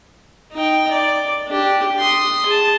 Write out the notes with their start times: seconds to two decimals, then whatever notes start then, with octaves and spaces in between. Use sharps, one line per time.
0.52 D#4 G5
0.91 D5
1.48 D4 G4
1.99 C6 D#6
2.46 G#4 A5